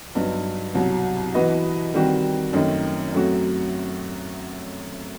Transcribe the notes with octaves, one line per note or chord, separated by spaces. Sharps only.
G2 F#3 B3 D#4
C2 B2 F#3
E3 B3 F#4 B4 D#5
D#3 G3 C4 F#4
F#2 D#3 A3 C4 D#4
F#2 F#3 A3 C4 F#4